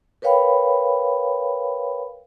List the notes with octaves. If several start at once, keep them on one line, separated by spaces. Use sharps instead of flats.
A#4 B4 C#5 F5 G5 B5